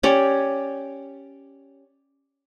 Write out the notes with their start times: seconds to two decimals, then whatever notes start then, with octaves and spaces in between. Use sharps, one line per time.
0.03 C#4 G4 C#5 D5